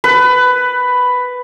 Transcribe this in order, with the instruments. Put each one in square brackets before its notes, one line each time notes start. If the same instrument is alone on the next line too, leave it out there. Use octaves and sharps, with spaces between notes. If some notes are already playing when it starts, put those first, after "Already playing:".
[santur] B4